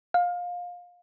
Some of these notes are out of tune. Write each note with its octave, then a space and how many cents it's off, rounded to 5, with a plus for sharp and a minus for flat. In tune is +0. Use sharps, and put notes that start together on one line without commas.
F5 +20